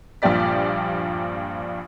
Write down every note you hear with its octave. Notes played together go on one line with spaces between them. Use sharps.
A#1 G2 A#2 G4 D5 B6